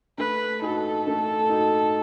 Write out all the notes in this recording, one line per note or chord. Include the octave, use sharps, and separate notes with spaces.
A3 B4
D#4 F#4 A4
A3
D#4 F#4